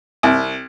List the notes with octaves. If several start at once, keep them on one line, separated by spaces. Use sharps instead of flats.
C2